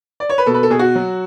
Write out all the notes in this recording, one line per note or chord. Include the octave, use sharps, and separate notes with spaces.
D5
C#5
B4
B2 A4
B4
A4
B2 G#4
F#4
F#3